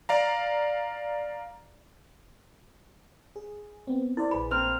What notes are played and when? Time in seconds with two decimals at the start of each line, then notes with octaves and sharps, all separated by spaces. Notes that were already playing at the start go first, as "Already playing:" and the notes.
0.09 D5 F5 A#5
3.36 G#4
3.87 B3 C4
4.17 E4 A#4 C5 D5
4.31 A#1 G#4 B4 B5
4.51 A#3 C4 F6